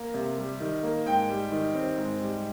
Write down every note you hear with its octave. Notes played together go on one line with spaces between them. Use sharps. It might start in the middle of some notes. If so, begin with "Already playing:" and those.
Already playing: A#3
C3
G3
D#3
A#3
G#2 G5
G3
D#3
C4
G#2
G3